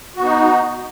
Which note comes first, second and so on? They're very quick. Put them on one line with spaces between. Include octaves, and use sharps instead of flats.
F#4 B3 D#4